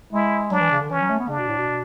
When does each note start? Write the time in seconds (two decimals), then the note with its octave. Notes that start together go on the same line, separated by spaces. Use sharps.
0.13 G#3 E4
0.51 F#3 D4
0.61 E3
0.71 C#3
0.81 D3
0.90 E3 C#4
1.00 F#3
1.10 A3
1.19 B3
1.29 C#3 D4
1.39 B2
1.49 A2
1.58 B2